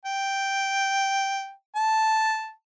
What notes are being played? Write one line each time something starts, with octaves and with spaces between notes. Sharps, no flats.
G5
A5